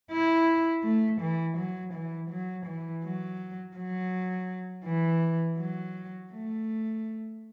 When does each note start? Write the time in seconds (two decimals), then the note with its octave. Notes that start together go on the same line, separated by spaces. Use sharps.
0.12 E4
0.84 A3
1.21 E3
1.58 F#3
1.94 E3
2.31 F#3
2.66 E3
3.04 F#3
3.76 F#3
4.85 E3
5.59 F#3
6.33 A3